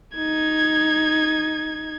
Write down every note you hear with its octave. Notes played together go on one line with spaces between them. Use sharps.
D#4 G#6